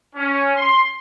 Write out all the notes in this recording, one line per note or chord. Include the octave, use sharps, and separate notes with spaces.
C#4
C6